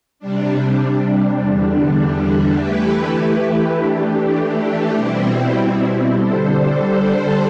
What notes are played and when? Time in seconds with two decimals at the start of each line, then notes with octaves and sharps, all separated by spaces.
0.19 C3 G3 D4
1.39 E2 D3 G3 D4
2.58 E3 A3 E4 G4 B4
3.76 E3 A3 D4 G4
4.95 B2 G3 C4 E4
6.15 D3 G3 D4 A4 C5